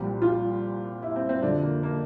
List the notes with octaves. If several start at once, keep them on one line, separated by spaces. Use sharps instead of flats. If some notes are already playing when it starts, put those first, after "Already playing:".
Already playing: C2 A#2 F3 G4
F4
E4
C4
C4
F2 D3 F3 D4
A#3
A#3